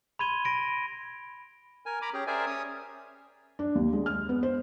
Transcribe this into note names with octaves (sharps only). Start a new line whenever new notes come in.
B5 C6 G#6 D#7 G7
B5 A#6 D7
A#4 G#5
A#5 B5 D6
C#4 G4 G#4
G#4 A#4 C5 D5 E5 G#5
C#4 C#5 D#6
D4
D#2
G#3
F6
B3
C5